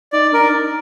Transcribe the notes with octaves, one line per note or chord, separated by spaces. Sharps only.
D#4 D5
D4 A#4
D#4